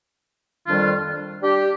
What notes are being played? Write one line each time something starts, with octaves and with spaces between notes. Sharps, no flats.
F2 D#3 G3 D4 F4
G3 D4 G4